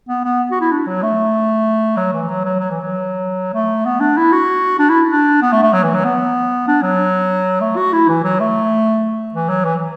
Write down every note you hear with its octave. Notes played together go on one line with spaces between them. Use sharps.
B3
B3
F#4
E4
D4
F#3
A3
F#3
E3
F#3
F#3
F#3
E3
F#3
A3
B3
D4
E4
F#4
D4
E4
D4
B3
A3
A3
F#3
E3
F#3
B3
D4
F#3
A3
F#4
E4
E3
F#3
A3
E3
F#3
E3